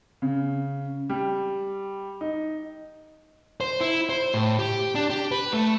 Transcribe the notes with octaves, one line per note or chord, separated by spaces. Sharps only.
C#3
G3
D#4
C5
E4
C5
A2
G4
D4
G4
B4
A3